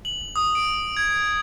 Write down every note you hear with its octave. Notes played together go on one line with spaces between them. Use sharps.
F#7
D#6
D7
G#6